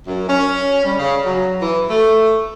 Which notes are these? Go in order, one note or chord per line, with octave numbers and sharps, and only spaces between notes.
F#2
C#4
G3
C#3
F#3
E3
A3